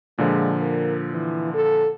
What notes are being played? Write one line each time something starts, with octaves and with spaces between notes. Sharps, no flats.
A#2 D3 F3 G#3
A#4
E3
A4